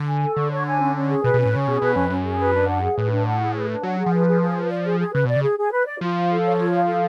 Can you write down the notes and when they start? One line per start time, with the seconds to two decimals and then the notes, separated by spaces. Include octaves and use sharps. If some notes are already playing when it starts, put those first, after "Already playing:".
Already playing: D3
0.08 G#5
0.22 A4
0.36 D3 C#6
0.51 C#5
0.66 G#5
0.81 C#4
0.95 C#4
1.08 G#4
1.23 B2 B4
1.34 B2
1.39 C#4
1.45 A2
1.52 C#3 C#4
1.66 B2 G#4
1.81 B2 B4
1.95 F2 C#4
2.10 F#2 C#4
2.25 G#4
2.39 B4
2.54 D4
2.68 F#5
2.83 G#4
2.97 A2 B4
3.11 D4
3.26 F#5
3.41 G#4
3.55 B4
3.69 D4
3.83 F#3 F#5
3.98 G#4
4.06 F3
4.13 B4
4.27 G#4
4.42 G#4
4.56 B4
4.71 D5
4.85 G#4
4.99 G#4
5.14 C#3 B4
5.25 B2 D5
5.36 C#3
5.42 G#4
5.58 G#4
5.72 B4
5.86 D5
6.00 F3 F4
6.16 F5
6.30 A4
6.45 C#5
6.59 F4
6.74 F5
6.87 A4